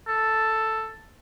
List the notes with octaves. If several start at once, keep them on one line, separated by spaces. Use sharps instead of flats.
A4